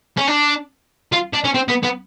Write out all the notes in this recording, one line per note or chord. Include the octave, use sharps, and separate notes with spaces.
C#4
D4
F4
D4
C#4
C4
B3
B3